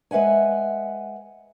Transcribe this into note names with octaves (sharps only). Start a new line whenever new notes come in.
G#3 B4 E5 F#5 G#5